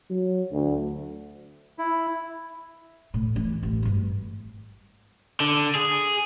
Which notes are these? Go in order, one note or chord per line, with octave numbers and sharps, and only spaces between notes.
F#3
D2
E4
A2
E3
A1
G#1 G2
D3
G#4